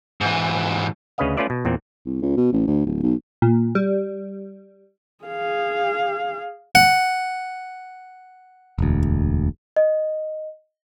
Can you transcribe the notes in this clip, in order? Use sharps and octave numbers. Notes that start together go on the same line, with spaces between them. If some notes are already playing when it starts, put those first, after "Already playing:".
G#2 E3
D2 C#3 C#4 B4 D#5 F5
A3 C#4 F4 B4 D5 E5
B2
E2 A#2 C4
C2
C#2
B2
A1
D2
D1
B1
A#2
G3
G#4 F5
F#5
E1 D2
D#5